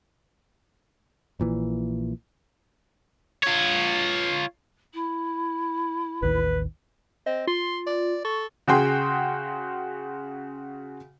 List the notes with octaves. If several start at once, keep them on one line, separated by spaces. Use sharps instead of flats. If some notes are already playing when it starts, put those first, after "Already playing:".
A#1 A#2 E3
F4 C#5
E4
A1 D#2 D#3 B4
C4 D#5
F4 C6
D5
A4 C#6
C#3 F#4 G#4 G5 C6